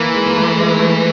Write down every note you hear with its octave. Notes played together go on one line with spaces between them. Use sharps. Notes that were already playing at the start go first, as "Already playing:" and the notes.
Already playing: E3 A#3
G#3
A#3
A3
G#3
A3